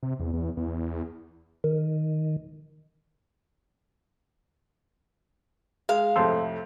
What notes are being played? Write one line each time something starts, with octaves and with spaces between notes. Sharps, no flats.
C3
E2
E2
E2
D#3
G#3 F5
F2 A2 C3 A4 C5